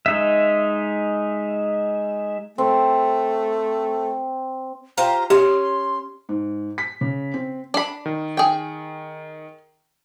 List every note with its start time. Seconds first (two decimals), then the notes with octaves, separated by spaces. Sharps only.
0.06 G#3 D#4 E5
2.58 A3 C4
4.98 F4 G4 C5 A#5
5.30 C#4 G4 C6
6.29 G#2
6.78 B6
7.01 C#3
7.34 C4
7.74 D4 B5
8.06 D#3
8.37 G#4 G5